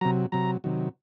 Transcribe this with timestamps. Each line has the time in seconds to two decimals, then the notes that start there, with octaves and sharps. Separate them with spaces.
0.01 C3 F#3 A#5
0.32 C3 F#3 A#5
0.64 C3 D#3 F#3